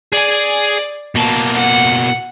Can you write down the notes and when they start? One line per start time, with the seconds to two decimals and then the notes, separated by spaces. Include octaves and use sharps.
0.13 G#4 D5 G#5
1.15 B2 A#3 A5
1.54 F#5